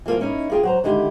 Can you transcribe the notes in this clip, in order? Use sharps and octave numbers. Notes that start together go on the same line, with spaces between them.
E3 F3 A#3 F4
A#3 C#4 D#4 E4
A#3 F4 G#4 G5
F#3 C5 A#5
D3 D#3 G#3 E4 G4